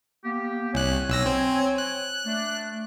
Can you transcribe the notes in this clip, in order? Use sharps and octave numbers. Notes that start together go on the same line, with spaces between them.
A#3 B3 G4
C2 C#5 G#5 F#6
B1 E6 A#6
C4
F#6
A3 D4